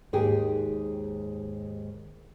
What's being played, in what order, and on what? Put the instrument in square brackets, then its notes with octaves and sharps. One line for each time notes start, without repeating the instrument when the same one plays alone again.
[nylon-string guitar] D#2 G#2 G4 G#4